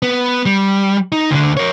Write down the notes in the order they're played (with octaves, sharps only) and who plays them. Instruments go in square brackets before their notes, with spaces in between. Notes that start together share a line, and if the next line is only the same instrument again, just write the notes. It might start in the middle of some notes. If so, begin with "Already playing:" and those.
[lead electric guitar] B3
G3
D#4
D2 D3
A#4 C#5